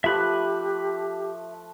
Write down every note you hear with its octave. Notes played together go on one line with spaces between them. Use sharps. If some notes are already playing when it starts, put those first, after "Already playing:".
F3 A3 G4 B4 E5 B5 F#6